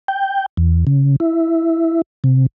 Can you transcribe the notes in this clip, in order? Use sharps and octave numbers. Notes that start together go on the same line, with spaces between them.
G5
E2
C#3
E4
C3